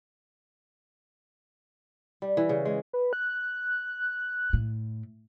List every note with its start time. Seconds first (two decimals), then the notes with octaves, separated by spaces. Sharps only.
2.22 G3
2.37 E3
2.49 C#3
2.65 G#3
2.93 B4
3.13 F#6
4.53 A2